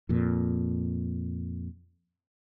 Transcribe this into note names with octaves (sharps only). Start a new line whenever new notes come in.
F2 A#2